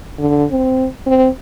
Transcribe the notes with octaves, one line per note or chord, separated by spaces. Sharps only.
D3
C4
C4